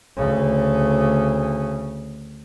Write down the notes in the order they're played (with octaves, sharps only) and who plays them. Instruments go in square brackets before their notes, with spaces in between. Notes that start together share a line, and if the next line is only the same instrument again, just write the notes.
[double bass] D2 C#3